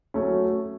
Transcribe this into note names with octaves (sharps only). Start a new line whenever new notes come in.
F#3 A3 C#4